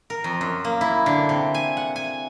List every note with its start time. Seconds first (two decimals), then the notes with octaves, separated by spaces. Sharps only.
0.10 A#4
0.24 F2
0.41 F#2
0.65 A#3
0.81 E4
1.06 D3
1.29 C3
1.54 G#5
1.77 F#5
1.96 G#5